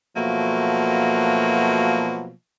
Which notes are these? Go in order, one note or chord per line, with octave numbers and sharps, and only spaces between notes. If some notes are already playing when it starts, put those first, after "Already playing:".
B2 F3 F#3 A3 A#3